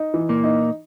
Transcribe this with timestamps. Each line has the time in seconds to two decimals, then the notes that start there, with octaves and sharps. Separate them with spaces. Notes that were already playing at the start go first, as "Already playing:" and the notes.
Already playing: D#4
0.14 E3
0.29 A#2 A#3
0.44 D#4